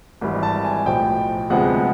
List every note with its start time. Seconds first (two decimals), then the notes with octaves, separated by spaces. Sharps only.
0.21 G#1 G#2 E3 G3
0.43 A5
0.64 G#5
0.85 B1 A2 F3 G5
1.50 D2 C3 F3 G#3 B3 F#5